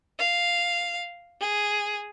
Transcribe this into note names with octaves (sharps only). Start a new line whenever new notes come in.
F5
G#4